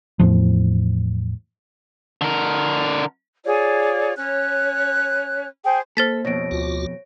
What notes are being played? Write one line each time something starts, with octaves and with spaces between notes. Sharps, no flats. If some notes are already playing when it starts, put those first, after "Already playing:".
E2 A2 F3
D3 A#4
F4 G#4 C#5 D5
C#4 C#5 F#6
G#4 C5 G5
A#3 A4 C5 A6 B6
F2 B2 C#5 A#6 D7
D2 F4 F#4